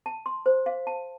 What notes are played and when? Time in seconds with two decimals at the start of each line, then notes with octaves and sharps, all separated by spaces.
0.06 A5
0.26 C6
0.46 C5
0.66 F5
0.87 A5